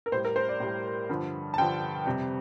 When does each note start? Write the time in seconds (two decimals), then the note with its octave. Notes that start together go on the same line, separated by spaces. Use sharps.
0.06 A#4
0.12 A2 G3 C5
0.25 A#4
0.36 C5
0.49 D5
0.60 A2 G3
1.09 G2 D3 F3
1.54 A5
1.58 G2 D3 F3 G5
2.06 F2 C3 G3